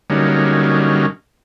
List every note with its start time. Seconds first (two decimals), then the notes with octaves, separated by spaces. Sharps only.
0.10 D3 F#3 G3 A#3 C#4 D#4